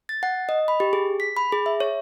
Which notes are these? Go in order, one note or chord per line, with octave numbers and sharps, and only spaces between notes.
A6
F#5
D#5
B5
G4
G#4
B6
B5
G#4
E5
C#5